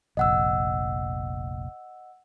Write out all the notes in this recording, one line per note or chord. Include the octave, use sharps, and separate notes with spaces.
F1 A#1 D#5 F#5 E6